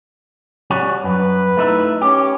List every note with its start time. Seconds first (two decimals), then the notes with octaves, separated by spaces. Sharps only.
0.70 G3 C#4 F#4
1.04 F#2 B4
1.57 A3 D#4 E4
2.02 C#4 G4